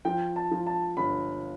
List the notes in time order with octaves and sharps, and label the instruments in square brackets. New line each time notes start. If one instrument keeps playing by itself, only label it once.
[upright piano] F3 [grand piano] G5
[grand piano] A5
[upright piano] F3
[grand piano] A5
[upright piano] G1 [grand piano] B5